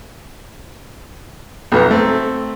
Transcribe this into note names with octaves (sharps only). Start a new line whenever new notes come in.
B1 F2 B3 A#5
A3 C4